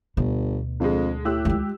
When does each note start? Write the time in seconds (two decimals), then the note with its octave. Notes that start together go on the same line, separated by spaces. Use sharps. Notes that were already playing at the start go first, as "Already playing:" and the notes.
0.17 G1 D2 B2
0.80 F2 D3 G#3
1.25 A2 G4 E6 F#6
1.45 G#3 F4